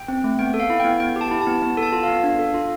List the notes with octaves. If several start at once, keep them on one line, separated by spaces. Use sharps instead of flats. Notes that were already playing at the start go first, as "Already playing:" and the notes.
Already playing: G5
C4
A3
B3 G5
A4
F5
E4
B3 G5
B3 G5
G4 A5
E4
A5
B3
B3
A4
A5
F4
F5
B3
D4
A4
F4